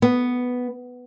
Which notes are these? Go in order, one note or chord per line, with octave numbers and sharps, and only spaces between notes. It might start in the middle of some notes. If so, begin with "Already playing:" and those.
B3